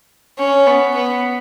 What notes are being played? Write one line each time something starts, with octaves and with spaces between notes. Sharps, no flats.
C#4
B3
B3